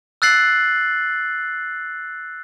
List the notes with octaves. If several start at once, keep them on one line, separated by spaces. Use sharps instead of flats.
E6 F#6 A6 C7 F#7